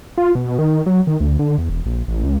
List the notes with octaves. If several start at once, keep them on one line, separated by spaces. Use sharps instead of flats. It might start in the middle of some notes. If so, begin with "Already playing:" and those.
F4
B2
D#3
F#3
D#3
D2
D3
E2
E1
A#1
A1
C#2